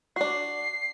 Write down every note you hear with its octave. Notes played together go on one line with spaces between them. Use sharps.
D4 F#4 C7